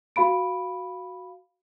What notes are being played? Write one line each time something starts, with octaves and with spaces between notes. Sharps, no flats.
F#4 F5 B5 D7